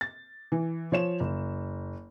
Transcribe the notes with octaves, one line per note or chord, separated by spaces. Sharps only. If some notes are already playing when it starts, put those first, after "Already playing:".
A6
E3
F3 C#5 E7
F#1